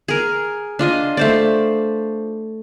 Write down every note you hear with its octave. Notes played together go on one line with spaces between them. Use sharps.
G#4 A#4
D4 F4 D#5
A3 C5 D5